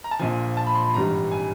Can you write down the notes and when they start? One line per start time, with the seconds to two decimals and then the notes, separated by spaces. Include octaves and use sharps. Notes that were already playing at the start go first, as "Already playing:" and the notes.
0.04 A#5
0.11 A5
0.19 A#1 A#2 F3 G#5
0.57 A5
0.67 B5
0.75 C6
0.84 B5
0.94 G#1 G2 E3 G3 A#5
1.31 G#5